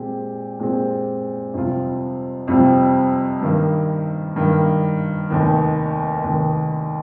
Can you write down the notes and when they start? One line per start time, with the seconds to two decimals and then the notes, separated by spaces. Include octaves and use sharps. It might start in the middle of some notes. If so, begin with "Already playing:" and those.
Already playing: A#2 G#3 C4 G4
0.59 A#2 G#3 C4 G4
1.54 F2 C3 G3 C4 F4
2.48 F2 C3 G3 C4 F4
3.42 G2 D#3 A#3
4.36 G2 D#3 A#3
5.30 F1 D#2 D#3
6.24 F1 D#2 D#3